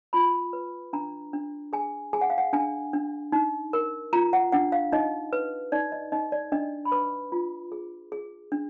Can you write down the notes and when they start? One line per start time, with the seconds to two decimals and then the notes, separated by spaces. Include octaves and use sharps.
0.13 F4 B5
0.53 B4
0.93 D4 A#5
1.33 D4
1.73 G#4 G#5
2.13 G#4 G#5
2.21 F#5
2.30 F5
2.38 F#5
2.53 D4 G#5
2.93 D4
3.32 D#4
3.73 A#4
4.13 F4 A#5
4.33 F#5
4.52 D4 F#5
4.72 F5
4.92 D#4 D#5
5.33 B4
5.72 D#4 D5
5.92 D#5
6.12 D#4 D#5
6.32 D5
6.52 D4 D#5
6.85 B5
6.92 B4 D6
7.32 F4
7.72 G#4
8.12 G#4
8.52 D4